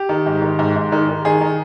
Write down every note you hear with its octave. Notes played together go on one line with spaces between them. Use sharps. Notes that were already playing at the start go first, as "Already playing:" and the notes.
Already playing: G4
D#3
G#2
D#3
G#2
G#2
D#3
D#3
D#3 G#4
D#3